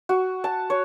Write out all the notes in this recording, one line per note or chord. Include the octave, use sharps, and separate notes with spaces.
F#4
A5
C#5